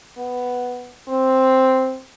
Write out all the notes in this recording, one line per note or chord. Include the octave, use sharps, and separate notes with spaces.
B3
C4